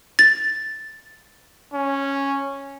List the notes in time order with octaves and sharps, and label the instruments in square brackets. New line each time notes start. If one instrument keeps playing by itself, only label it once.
[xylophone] A6
[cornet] C#4